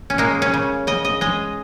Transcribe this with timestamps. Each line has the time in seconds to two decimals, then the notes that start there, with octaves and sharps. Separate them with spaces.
0.10 C#4
0.18 G#3 A#3
0.42 C#4
0.54 C#3
0.87 C#3 D#5
1.05 D#5
1.21 G#3 D#5